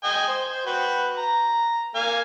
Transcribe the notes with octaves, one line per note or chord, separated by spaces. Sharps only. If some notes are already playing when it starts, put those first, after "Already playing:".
D#5 G5 G#5
C5
C5
F#4 B4 G5
A#5
A#3 F5 G#5